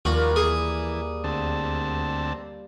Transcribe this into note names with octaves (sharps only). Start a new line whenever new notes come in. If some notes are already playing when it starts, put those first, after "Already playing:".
D#2 F3 G3 A#3 F4 F#4 A#4
E3 G#4
D2 C4 A5